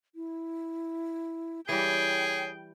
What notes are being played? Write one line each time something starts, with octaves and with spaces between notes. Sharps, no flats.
E4
E3 G3 G#4 C#5 G5